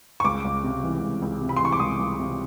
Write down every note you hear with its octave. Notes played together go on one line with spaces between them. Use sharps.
C#6
C#2 D6
C#2
C3
E3
C#2
C#2
C3
B5
C6
E3 C#6
D6
C#2 D#6
C#2
C3